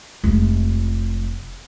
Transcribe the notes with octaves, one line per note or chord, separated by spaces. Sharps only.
F1 G#3